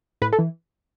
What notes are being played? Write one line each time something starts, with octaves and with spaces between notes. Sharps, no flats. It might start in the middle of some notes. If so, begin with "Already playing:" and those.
A2 B4
A4
E3